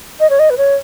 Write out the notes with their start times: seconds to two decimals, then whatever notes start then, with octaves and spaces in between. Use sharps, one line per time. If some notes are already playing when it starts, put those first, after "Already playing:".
0.20 D#5
0.30 C#5
0.39 D#5
0.50 B4
0.58 C#5